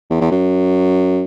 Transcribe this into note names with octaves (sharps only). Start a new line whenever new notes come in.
E2
E2
F#2